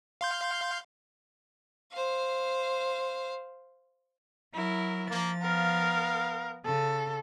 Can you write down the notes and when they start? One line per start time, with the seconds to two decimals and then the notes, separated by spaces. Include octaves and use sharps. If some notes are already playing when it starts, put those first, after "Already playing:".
0.21 F5 C6 G6
1.92 C5 F5
4.54 F#3 E4 A#4
5.09 F3 A#3 A6
5.42 B3 A#4 F5
6.65 C#3 A4